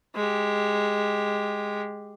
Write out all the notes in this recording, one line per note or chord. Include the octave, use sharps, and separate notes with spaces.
G#3 G4